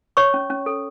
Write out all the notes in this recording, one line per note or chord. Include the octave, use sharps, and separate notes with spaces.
C#5 C#6
C#4
C#4
A4